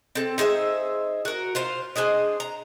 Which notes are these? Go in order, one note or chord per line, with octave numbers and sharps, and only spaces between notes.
C4 A4
D#4 G#4 C5 E5
F#4 A#4
F4 C5 F5
D4 G#4 C5 D#5
A#5